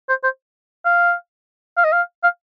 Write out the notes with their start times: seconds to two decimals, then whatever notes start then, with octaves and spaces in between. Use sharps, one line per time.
0.09 C5
0.24 C5
0.85 F5
1.77 F5
1.84 D#5
1.92 F5
2.23 F5